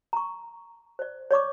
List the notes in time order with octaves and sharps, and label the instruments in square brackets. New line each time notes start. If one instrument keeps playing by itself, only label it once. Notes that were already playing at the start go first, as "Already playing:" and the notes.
[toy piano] A#5 C#6
C5 D5
C#5 D5 C#6 D6